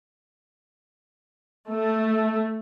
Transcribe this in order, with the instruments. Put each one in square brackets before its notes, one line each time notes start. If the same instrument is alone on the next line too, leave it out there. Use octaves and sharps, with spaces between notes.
[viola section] A3